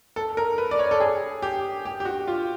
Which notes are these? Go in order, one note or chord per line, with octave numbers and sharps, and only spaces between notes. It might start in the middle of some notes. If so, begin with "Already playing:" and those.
A4
A#4
B4
D5
C#5
A4
G#4
G4
G4
G4
F#4
F4